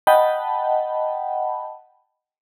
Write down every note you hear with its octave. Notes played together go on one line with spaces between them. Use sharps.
D#5 F#5 G5 A5 B5